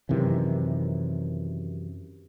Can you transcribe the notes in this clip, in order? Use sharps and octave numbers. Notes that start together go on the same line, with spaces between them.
F#2 C3 D#3 E3